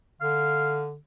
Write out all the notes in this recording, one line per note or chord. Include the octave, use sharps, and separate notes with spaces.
D3 F5